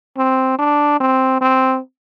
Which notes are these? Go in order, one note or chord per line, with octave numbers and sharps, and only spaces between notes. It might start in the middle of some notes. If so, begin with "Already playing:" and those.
C4
D4
C4
C4